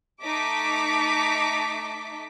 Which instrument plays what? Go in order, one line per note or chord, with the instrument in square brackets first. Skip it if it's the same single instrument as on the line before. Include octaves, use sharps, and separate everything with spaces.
[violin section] A3 D#4 A5 D6 B6